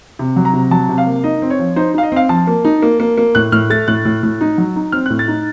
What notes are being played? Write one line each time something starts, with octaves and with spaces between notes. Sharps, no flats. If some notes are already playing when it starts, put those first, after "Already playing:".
C3
F#3
A#5
C3
F#3 A5
C3
F5
A#3
D#4 D#5
C4
C#5
F3
D#4 C5
D#4 F5
D#5
C4 F5
F3 A5
A#3
D#4
A#3
A#3
A#3
A2 F#6
A2 F6
A3 A6
A2 F#6
A2
A2
D#4
F#3
D#4
C4 F6
A2 F#6
A6
D#4